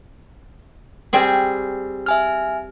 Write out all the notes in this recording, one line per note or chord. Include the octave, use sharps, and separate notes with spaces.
G3 C4 G#4
E5 G#5 F6